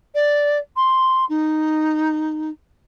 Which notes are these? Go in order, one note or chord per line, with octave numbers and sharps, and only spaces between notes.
D5
C6
D#4